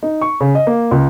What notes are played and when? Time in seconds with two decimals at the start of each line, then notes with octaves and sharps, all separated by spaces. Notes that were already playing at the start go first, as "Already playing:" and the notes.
0.03 D#4
0.22 C#6
0.41 C#3
0.55 D#5
0.67 A#3
0.91 C#2